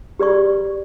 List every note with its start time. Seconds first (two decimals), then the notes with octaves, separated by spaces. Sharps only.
0.19 G4 B4 D5 C#6